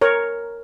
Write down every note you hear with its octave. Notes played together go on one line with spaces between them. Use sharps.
A#4 C#5